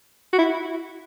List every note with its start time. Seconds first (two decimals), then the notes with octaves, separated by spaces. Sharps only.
0.33 F#4
0.39 E4